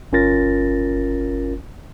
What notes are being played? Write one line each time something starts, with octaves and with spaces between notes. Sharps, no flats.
G1 C#4 F4 A#4 A6 A#6